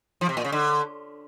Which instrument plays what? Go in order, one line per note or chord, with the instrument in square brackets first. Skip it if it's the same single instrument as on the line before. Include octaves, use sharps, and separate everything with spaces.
[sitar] F3
C3
A#2
C#3
D3